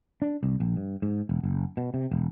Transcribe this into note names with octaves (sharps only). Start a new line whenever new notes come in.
D4
C2
A#1
G2
G#2
E1
F#1
B2
C3
E1